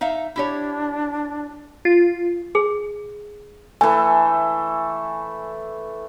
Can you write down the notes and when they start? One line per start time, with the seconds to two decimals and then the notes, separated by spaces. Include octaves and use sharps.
0.01 D#4 E5 F5
0.36 D4 E4 G4 C#5
1.85 F4
2.55 G#4
3.81 E3 A3 G#5